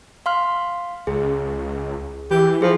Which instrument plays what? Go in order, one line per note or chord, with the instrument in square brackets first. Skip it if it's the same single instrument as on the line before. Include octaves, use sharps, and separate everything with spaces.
[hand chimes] F5 C6 F6
[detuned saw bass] C#2 [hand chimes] G#4
[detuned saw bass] E3 [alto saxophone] G4
[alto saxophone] F3 [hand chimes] G#4